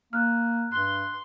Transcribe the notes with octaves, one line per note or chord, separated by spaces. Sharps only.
A#3 F6 F#6
G2 C6 F#6 G7